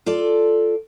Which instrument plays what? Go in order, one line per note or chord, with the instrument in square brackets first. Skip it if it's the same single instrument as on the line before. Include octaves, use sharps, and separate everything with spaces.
[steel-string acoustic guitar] F4 A4 D5